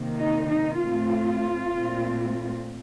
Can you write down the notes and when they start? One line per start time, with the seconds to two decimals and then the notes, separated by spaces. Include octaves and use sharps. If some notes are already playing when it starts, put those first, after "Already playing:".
Already playing: C3 D#3 A#3
0.19 D#4
0.50 D#4
0.81 A2 A3 C4 F4
1.75 A#2 A3 C4